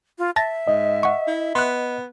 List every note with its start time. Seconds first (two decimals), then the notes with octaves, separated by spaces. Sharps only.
0.18 F4
0.36 E5 A5 A6 A#6
0.67 G#2 D#5
1.03 F#5 C#6
1.28 E4
1.55 B3 C6 F#6